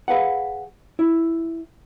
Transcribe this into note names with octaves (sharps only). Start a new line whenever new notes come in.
G#4 B4 F5 F#5
E4